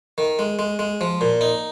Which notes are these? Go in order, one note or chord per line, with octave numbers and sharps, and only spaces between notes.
D#3
G#3
G#3
G#3
F3
A#2
D#4